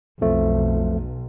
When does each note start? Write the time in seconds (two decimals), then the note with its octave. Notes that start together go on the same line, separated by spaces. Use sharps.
0.21 B1 F2 F3 A3